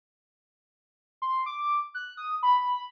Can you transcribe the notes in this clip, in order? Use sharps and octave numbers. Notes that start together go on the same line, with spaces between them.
C6
D6
F#6
D#6
B5